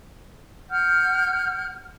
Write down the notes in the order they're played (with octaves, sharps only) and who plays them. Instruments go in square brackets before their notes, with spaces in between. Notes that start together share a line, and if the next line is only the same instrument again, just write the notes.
[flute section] F#5 F6 G6